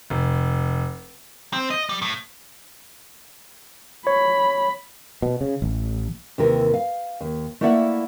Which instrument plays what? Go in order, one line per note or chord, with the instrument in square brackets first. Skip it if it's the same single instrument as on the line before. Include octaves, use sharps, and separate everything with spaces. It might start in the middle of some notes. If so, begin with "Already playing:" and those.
[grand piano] F1
[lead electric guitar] C4
D#5
G3
A2
[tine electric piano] C#5 [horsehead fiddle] B5
[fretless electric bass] B2
C#3
A1
[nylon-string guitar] D#2 C3 E3 A#4
F5
D#2
A3 A#3 E4 D5 E5 F#5